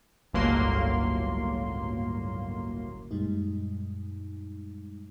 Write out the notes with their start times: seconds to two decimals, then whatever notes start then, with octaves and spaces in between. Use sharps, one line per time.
0.33 G1 C#2 A2 F#3 A#3 C6
3.11 F#2 A#2 G3 G#3 D#4